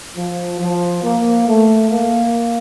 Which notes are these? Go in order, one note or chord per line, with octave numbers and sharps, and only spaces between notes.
F3
F3
A#3
A3
A#3